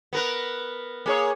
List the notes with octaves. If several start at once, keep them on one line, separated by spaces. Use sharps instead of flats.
B3 A#4 B4
A#3 G#4 C#5